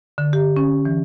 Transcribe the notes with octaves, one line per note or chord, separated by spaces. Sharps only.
D3
G4
C#4
E3